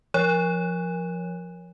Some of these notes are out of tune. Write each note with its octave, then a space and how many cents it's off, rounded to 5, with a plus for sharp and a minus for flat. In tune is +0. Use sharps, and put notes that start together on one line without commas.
F3 +0 C#5 +0